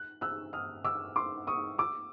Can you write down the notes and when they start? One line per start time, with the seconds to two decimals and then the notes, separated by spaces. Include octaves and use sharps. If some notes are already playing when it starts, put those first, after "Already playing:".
Already playing: F#6
0.21 E6 F#6
0.53 D#6 F6
0.85 D6 E6
1.16 C6 D6
1.47 C#6 D#6
1.78 D6 E6